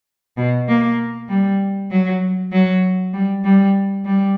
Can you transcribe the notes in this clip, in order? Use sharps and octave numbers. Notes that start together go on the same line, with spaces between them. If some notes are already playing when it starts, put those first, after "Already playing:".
B2
A#3
G3
F#3
F#3
G3
G3
G3